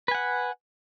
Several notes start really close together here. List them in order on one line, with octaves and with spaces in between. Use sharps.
B4 G#5 F#5